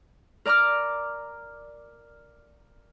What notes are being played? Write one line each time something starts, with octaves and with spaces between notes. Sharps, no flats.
A#4 D5 A#5 D6 F6